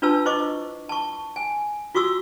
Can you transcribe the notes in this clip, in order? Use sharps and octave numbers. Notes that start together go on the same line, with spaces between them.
D4 F4 B4 A5 E6
E4 C5 D#5 C#6 D6
A5 C#6
G#5
F4 F#4 C#6 D#6 E6